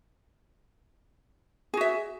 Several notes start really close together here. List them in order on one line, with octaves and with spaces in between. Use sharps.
G#4 F#4 E5